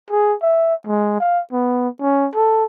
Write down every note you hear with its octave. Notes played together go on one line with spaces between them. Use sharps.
G#4
E5
G#3
F5
B3
C#4
A4